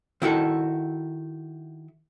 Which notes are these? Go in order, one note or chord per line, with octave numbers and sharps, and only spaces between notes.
D#3 E4 F#4 A4